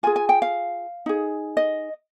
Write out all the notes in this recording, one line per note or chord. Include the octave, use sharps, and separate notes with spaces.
F4 G#4 G#5
G#5
G5
F5
D#4 G#4
D#5